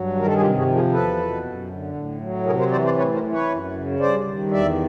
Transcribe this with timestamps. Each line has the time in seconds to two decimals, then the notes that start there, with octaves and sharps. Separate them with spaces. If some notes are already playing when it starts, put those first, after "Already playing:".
Already playing: G2 F#3
0.15 D#3 A#4
0.27 A4
0.34 G#4
0.40 C3 F4 G4
0.58 F#4 G#4
0.66 F3
0.74 G#4 A#4
0.92 E2 A4 B4
1.18 B2
1.43 F#2
1.70 D3
1.94 A2
2.21 F#3
2.46 C3 G#4 A#4
2.59 A#4 C5
2.71 E3 C5 D5
2.85 C5 D5
2.97 A2 B4 C#5
3.14 A#4 C5
3.23 E3
3.32 B4 C#5
3.49 F#2
3.74 C#3
4.00 G2 C5 D5
4.26 D#3
4.51 E2 D5 E5